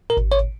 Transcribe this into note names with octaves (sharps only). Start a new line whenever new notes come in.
A#4
G#1
C#5